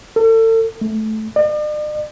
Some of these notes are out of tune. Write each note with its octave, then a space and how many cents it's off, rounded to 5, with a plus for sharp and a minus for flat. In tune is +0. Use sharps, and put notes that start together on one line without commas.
A4 +35
A3 -15
D5 +45